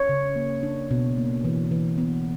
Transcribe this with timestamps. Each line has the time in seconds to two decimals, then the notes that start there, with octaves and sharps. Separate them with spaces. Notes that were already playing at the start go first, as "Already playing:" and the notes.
Already playing: C#5
0.09 C#3
0.36 A#3
0.63 D4
0.91 B2
1.18 A#3
1.45 E3
1.71 E3
1.98 B3